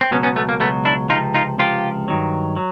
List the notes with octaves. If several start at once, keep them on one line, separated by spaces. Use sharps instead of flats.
C4
C#2 B2 F#3 B3 C#4
B3 C#4
A3 B3
A#3
C#2 B2 F#3 A3 B3
D4 E4
C#2 C3 F3 D#4 F4
D#4 F4
C#2 C3 F3 F4 G4
G2 D#3 F#3
F#3